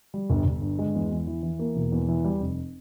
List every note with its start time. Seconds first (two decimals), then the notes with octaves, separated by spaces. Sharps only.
0.14 G3
0.30 G1
0.45 G1
0.61 G2
0.79 G#3
0.95 E2
1.11 E2
1.27 E3
1.43 E3
1.59 A#3
1.75 E1
1.92 E2
2.08 E3
2.24 G3
2.40 F1